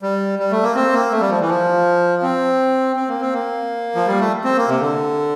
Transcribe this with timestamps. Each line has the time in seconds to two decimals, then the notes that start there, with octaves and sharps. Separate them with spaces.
0.02 G3
0.39 G3
0.51 A3
0.63 A#3
0.75 C4
0.93 A#3
1.12 A3
1.21 G3
1.30 F3
1.40 E3
1.49 F3
2.22 C4
2.96 C4
3.09 A#3
3.21 C4
3.33 A#3
3.95 F3
4.07 G3
4.19 A3
4.44 C4
4.57 A#3
4.68 C3
4.80 D3